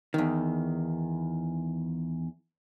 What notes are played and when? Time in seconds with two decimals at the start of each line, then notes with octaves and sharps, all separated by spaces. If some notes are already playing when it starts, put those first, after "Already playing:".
0.14 E2 D#3